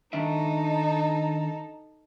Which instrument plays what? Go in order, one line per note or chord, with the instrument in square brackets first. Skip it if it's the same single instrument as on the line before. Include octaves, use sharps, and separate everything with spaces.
[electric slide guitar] D#3 D4 E5 [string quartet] D#4 A4